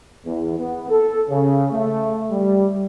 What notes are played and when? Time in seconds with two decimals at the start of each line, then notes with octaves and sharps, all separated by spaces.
0.25 E2
0.58 B3
0.90 A4
1.30 C#3
1.72 A3
2.31 G3